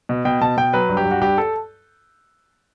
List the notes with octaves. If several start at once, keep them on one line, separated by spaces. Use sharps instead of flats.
B2
B2 G5
B2 A5
B2 G5
F#3 B4
G2
G4
G2
F#4
G2 G4
A4